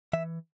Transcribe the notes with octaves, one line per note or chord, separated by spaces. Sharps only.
E3 E5